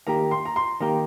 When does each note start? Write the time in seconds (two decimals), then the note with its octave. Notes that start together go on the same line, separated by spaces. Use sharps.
0.07 D#3 A#3 G4 A#5
0.31 C6
0.45 A#5
0.56 C6
0.80 D#3 A#3 G4 A#5